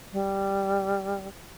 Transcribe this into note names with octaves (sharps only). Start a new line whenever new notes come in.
G3